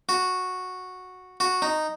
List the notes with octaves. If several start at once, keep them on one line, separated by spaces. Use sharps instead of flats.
F#4
F#4
D#4